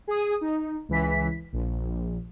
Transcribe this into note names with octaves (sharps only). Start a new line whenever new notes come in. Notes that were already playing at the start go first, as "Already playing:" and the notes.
G#4 D#6
D#4
C#2 E3 B6
A#1